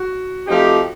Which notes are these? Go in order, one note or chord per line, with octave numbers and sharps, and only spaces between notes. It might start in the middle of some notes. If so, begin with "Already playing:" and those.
Already playing: F#4
F3 A3 C4 D#4 G4